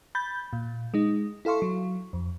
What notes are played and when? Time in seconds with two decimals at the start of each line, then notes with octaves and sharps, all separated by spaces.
0.15 B5 G6 A6
0.53 A#2
0.94 G#3 D#4
1.45 E4 A4 F5 C6 C#6
1.62 F#3
2.13 F2